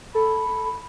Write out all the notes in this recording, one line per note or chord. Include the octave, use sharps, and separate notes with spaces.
A4 B5